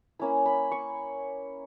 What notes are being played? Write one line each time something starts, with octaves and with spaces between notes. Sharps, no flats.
A#3 C#4 E4 B5
B5
C#6